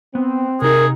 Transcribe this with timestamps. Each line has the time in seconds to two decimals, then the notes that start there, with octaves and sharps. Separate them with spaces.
0.15 B3 C4
0.62 C3 D#4 G#4 A#4